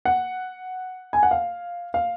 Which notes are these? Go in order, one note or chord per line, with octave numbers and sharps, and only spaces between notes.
F#5
G#5
F#5
F5
F5